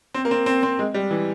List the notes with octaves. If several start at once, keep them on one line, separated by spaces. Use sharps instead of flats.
C4
A#3
C4
C4
C4
G#3
G3
E3